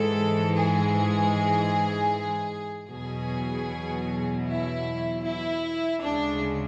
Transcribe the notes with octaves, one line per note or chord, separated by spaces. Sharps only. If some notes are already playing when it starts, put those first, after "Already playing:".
Already playing: G#2 E3 G#3 A4
G#4
E2 B2 F#3 G#4
E4
E4
D2 C#3 G#3 D4